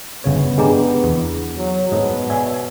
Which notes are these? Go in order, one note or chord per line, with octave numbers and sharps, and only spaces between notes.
G1 C#3 B3 C#5
G#3 D4 G4 G#4 D5 A#5
E2
F#3
G#2 B2 D#5
C#5 D5 E5 F#5 G#5